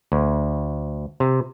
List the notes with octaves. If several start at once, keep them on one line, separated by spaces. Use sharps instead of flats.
D2
C3